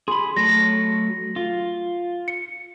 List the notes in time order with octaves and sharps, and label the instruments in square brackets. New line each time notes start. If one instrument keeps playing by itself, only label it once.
[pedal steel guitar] G#4 B5 [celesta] C6
[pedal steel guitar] F#3 A3 [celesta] A#6
[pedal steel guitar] F4
[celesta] C#7